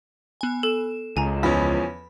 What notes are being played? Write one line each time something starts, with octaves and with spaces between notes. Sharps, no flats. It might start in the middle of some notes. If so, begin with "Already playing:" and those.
B3 G#5
A4 E7
C#2 G#5 A#5
E2 F3 C#4 B5